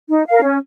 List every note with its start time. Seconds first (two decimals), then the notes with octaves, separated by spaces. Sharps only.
0.10 D#4
0.26 A#4 F5
0.42 C#4